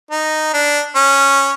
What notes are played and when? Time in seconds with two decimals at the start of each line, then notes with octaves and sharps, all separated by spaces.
0.11 D#4
0.54 D4
0.95 C#4